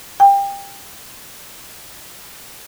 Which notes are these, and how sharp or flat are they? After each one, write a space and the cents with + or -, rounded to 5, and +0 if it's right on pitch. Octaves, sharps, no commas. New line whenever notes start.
G5 +25